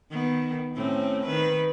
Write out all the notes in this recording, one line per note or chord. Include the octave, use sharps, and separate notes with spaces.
D#3 B3
A2 C4 C#4
D#3 B4